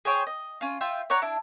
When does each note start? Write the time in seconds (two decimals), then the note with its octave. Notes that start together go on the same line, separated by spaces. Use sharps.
0.05 G#4 C5 C#5 G5
0.27 D#5
0.61 C#4 F4
0.81 F4 E5 G5
1.10 C#5 D5 F#5 A#5
1.22 D4 E4